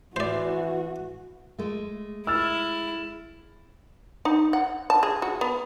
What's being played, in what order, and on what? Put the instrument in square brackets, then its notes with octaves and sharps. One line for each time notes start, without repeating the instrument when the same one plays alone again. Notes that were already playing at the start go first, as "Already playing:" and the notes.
[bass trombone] E3 [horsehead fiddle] F#4 [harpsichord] C5 D5
[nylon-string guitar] G#3 A3
[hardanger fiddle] E4 [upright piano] E6 F6 A6
[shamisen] D#4
F#5
A5
G#4
F#4
B3